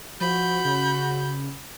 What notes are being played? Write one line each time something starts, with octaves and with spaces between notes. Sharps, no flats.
F3 F#4 B5 G6
C#3